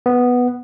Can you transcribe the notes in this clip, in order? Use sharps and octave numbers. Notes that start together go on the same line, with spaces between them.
B3